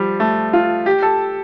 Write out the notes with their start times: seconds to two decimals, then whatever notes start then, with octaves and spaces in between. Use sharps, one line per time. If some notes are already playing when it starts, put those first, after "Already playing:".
Already playing: F3 G3
0.20 A3
0.53 F4
0.86 G4
1.03 A4